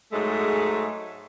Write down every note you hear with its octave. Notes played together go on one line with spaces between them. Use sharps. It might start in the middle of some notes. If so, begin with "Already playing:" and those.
G#2 F#3 G#3 A3